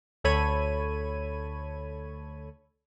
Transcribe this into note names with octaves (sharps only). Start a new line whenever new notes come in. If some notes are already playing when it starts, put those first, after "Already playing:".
D2 A4 C#5 B5 G#6 D#7